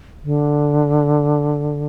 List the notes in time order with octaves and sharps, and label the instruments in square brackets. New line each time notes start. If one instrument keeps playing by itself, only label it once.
[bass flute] D3